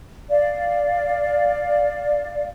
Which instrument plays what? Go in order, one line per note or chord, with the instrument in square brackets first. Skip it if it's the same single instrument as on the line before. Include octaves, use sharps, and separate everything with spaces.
[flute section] D5 F5